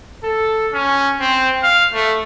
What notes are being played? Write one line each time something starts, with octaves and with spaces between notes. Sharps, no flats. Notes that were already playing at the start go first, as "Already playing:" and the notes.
A4
C#4
C4
F5
A3